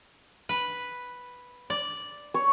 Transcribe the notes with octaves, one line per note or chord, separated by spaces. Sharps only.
B4
D5
C#5